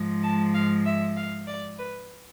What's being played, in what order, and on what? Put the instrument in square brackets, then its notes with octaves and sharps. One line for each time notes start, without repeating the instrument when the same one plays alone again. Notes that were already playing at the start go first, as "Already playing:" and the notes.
Already playing: [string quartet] G#2 F3 G#3
A5
F5
E5
F5
D5
B4